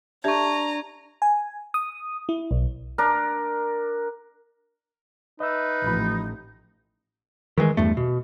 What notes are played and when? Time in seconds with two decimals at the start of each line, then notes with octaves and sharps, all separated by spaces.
0.24 D4 G4 E5 A#5 C#6 G#6
1.22 G#5
1.74 D#6
2.29 E4
2.51 B1
2.98 D4 A#4
5.40 D#4 B4 D#5 E5 E6
5.87 A1 F3 B5
7.58 D#3 E3 G3 G#3
7.77 E2 G2 A3
7.97 B2